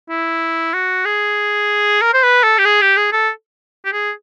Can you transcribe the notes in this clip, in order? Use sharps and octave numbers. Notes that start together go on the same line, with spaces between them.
E4
F#4
G#4
A#4
C5
B4
A4
G4
G#4
G4
G#4
A4
G4
G#4